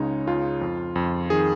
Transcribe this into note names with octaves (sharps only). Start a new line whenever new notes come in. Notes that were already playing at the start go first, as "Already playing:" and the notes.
Already playing: C#2 C#3 G#3 D#4 C#5
C#2 F4
F2
F2
D#3 G#4